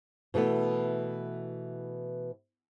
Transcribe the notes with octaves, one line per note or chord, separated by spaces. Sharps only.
B2 E3 A3 B3